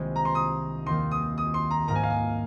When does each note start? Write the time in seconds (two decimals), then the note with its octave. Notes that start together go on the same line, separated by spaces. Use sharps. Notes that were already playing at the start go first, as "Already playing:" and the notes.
Already playing: C2 C3 D#3 G#3 A#3 F4
0.16 A#5
0.25 C6
0.35 D#6
0.86 D#2 D#3 A#3 D#4 C6
1.11 D#6
1.38 D#6
1.54 C6
1.71 A#5
1.88 G#2 D#3 A#3 A#5
1.95 G#5
2.03 F5
2.11 G#5